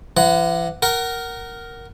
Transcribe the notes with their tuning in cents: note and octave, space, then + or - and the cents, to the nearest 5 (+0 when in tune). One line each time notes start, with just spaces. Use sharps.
E3 +40 F#5 +0
A#4 +0 F#5 +25